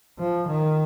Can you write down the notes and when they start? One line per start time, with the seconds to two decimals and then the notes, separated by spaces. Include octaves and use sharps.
0.19 F3
0.47 D#3